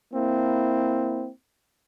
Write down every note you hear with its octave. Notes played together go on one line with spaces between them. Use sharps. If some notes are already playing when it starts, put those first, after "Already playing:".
A#3 C4 E4